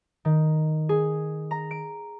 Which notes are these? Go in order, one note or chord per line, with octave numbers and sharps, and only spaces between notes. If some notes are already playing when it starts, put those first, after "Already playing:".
D#3
G#4
A#5
D7